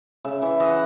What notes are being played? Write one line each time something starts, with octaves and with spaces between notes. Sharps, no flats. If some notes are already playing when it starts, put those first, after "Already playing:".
C#3 E5
E3 E5
E3 D#5
F#5